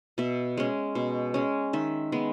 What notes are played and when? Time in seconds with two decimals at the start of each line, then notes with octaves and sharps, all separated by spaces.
0.18 B2 E5
0.57 G#3 C#4
0.95 B2
1.34 G#3 C#4
1.73 D#3 E5
2.12 G#3 B3